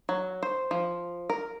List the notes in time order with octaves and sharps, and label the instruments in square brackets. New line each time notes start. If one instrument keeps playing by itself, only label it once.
[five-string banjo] F#3
C5
F3
A#4